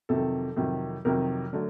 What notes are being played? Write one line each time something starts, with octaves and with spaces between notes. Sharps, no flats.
F2 C3 D#3 F#3 A4
F2 C3 D#3 F#3
F2 C3 D#3 F#3 A#4
D3 F#3 A3